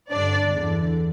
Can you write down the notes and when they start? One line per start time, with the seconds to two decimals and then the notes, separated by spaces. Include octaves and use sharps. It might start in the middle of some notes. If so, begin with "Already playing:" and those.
0.11 G2 D3 D4 D5
0.51 E2 D3